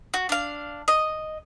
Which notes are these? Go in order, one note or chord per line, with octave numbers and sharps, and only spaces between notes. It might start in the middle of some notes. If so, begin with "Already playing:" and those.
F#4
D4 F5
D#5